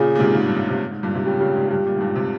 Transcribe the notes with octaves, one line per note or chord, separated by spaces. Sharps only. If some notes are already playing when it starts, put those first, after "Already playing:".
Already playing: A#2 C#3 G#4
A#2
G#2 C3
G#2
G2
G#2
G#2 C3
G#2
G2 A#2
G#2 C3
A#2 C#3 G4
A#2 C#3
G#2
G2 A#2 G4
G2 A#2
G#2
G2 A#2
C3